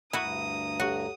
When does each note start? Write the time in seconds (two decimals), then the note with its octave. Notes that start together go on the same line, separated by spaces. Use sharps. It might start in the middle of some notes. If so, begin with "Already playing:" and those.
0.13 D2 G2 E4 F#4 A#5 D#6
0.80 F#4 G4 A4 C#5